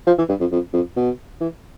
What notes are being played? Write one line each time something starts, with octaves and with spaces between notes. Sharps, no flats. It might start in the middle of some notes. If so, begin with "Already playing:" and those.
F3
E3
G2
F2
F2
F2
B2
E3